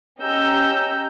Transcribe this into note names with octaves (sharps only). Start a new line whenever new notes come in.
C#4 G4 D#5 A#5 E6 G6